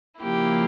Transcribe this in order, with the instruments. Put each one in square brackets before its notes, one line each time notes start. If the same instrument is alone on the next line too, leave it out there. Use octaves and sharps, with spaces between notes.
[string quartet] C#3 F3 A#3 E4 G4